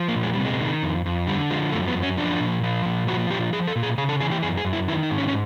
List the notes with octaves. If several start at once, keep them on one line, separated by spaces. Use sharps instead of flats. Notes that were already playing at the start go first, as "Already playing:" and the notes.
Already playing: F3
A#3
A#2
G#3
C3 G3
G#3
D#3
F2
F2
D3 G3
F3 G#3
F#2 A3
B3
F#2
C#4
F3 D4
A#2
F3
A#2
F3 F#4
A#2 G4
F3 G#4
A4
A#2
G#4
C#3 G#4
A4
E3 G#4
G4
F#2 G#4
G#4
F#2
E4
D#3 E4
D#4
G#2
C#4
C#4